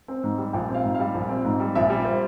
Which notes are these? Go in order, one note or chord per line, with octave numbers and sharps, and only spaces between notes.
C4
G#2
G3
A#1 G5
C4
F5
G#2
F5
G3
A#1
C4
G#2
G3
A#1 E5
G3
C5